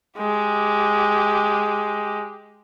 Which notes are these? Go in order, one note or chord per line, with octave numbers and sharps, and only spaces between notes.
G#3 G4